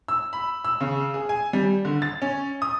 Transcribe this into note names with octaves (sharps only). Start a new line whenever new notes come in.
E6
B5
E6
C#3
G#4
G#5
G3
D3
A6
C#4
D#6